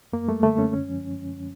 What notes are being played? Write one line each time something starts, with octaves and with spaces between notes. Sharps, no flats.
F#2 A#3
G3 A3
D3 A3
F#2 C#4
G#3 C#4
F3